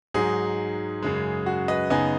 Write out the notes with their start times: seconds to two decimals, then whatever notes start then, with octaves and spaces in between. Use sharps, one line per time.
0.14 G#2 F#3 D#4 G#4
1.02 F#2 C#3 G#3
1.46 F#4
1.68 B4 D#5
1.90 F#2 C#3 B3 D#4 D#5 G#5